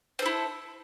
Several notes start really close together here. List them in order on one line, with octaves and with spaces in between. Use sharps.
C5 A4 E4